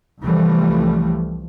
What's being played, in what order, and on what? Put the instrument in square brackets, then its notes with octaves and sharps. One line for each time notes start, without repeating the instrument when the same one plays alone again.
[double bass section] C2 E3 F3 G3 A3